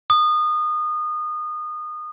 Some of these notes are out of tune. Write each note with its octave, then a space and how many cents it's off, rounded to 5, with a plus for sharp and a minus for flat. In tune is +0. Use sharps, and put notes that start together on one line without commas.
D#6 -25